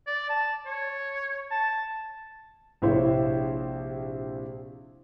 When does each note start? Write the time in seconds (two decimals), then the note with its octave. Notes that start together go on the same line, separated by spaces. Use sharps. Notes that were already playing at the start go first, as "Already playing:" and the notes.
0.07 D5
0.29 A5
0.66 C#5
1.50 A5
2.82 A#1 C3 E4 C5 C#5 F5